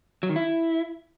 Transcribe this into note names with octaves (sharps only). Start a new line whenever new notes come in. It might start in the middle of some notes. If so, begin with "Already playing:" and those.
F#3
D#3
E4